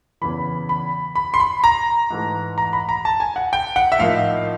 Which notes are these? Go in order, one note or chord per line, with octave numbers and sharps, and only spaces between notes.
E2 C#3 E3 B5
B5
B5
C6
B5
A#5
G#2 E3 A3
A#5
B5
A#5
A5
G#5
F#5
G5
F#5
E5
A2 F3 A#3 D#4 F5